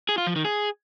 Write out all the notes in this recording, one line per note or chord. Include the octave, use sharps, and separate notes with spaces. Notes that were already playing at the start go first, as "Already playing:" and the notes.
G#4
F4
F3
D#3
G#4